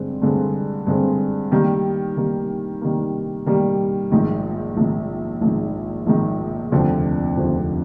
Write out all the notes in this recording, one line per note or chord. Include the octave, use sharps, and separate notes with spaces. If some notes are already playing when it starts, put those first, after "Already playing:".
Already playing: G2 D3 G#3 C4
G2 D3 G#3 C4
G2 D3 G#3 C4
D#3 G3 A#3
D#3 G3 A#3
D#3 G3 A#3
D#3 G3 A#3
A#1 G#2 D#3
A#1 G#2 D#3
A#1 G#2 D#3
A#1 G#2 D#3
F1 D#2 D3 F3 C4
F1 D#2 D3 F3 C4